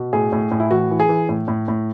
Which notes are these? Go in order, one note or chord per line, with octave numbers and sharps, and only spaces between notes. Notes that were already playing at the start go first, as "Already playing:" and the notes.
Already playing: B2
A2 G#4
A2
A2
E4
E3 F#4
E3
G#4
E3
A2
A2
A2